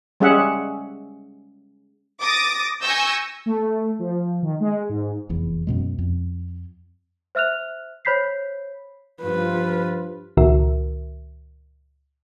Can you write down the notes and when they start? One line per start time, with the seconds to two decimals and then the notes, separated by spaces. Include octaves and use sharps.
0.20 G3 G#3 C#4 G#4 E5 F#5
2.21 D6 D#6 A6 A#6 D7
2.81 G#5 C#6 E6 G6 A#6
3.46 A3
3.99 F3
4.43 D#3
4.60 G#3
4.89 G#2
5.29 F1 E2
5.67 F#2 B2 G#3
5.99 F2
7.35 C5 E5 F6 F#6 F7
8.05 C5 C#5 B5 G6 B6 C7
9.23 G2 F3 F4 B4
10.37 C#2 A#2 D#3 F#4 A#4 E5